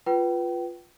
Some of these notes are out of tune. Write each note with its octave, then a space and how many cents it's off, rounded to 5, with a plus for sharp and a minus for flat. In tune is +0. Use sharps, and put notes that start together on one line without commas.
F4 +0 B4 -5 G5 -35